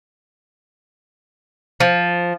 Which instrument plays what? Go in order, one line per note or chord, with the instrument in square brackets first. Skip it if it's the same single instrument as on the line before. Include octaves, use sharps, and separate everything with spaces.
[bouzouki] F3